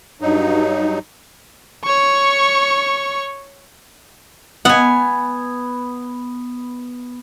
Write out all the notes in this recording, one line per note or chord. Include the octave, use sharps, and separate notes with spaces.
G2 F#3 D#4
C#5 C#6
B3 F#5 G#5